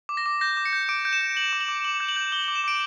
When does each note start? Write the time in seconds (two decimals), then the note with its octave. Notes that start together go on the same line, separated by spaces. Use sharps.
0.09 D6
0.17 A#6
0.26 D6
0.41 G6 A#6
0.57 D6
0.65 C#7
0.73 G6
0.89 D6 D7
1.05 G6 D7
1.13 E7
1.21 G6
1.36 G6 F#7
1.53 D6
1.61 F#7
1.68 D6
1.84 D6 F#7
2.00 G6
2.08 F#7
2.16 G6
2.32 D6 G7
2.44 D6 F#7
2.55 E7
2.64 D6 D7